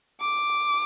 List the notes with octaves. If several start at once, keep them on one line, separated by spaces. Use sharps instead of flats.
D6